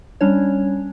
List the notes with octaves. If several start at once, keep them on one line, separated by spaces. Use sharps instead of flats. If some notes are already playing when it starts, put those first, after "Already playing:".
G3 C#4 D4 C#5